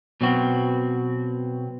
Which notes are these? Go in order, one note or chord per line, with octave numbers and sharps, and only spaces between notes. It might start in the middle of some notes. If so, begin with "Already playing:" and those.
B2 F#3 C4 F#4